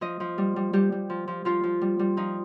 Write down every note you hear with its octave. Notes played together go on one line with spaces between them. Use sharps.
F3 D#5
F3
G3
G3
G3 G4
G3
F3
F3
F3 F4
F3
G3
G3
F3 D#4